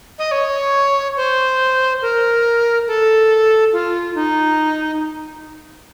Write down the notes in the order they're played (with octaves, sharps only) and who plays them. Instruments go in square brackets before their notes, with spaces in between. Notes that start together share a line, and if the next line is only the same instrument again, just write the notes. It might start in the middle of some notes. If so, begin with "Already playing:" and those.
[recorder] D#5
C#5
C5
A#4
A4
F4
D#4